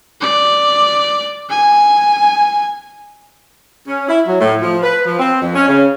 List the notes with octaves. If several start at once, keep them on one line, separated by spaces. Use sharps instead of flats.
D5
G#5
C#4
E4
F#3
A2
F3
B4
F3
C4
F2
C#4
C#3